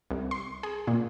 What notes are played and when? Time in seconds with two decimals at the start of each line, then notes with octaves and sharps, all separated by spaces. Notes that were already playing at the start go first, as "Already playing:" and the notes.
0.11 C2
0.31 C6
0.63 G#4
0.87 A#2